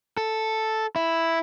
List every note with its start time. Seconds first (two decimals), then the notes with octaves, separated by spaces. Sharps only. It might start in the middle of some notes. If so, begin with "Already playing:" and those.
0.17 A4
0.96 E4